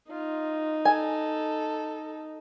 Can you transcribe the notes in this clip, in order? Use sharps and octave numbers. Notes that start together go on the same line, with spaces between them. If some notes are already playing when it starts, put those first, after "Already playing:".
D#4 F4
A4 G#5